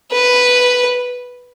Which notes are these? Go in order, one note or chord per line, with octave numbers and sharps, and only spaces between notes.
B4